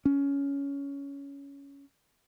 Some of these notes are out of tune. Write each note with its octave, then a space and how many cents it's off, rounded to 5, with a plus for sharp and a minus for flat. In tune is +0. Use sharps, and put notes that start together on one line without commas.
C#4 +15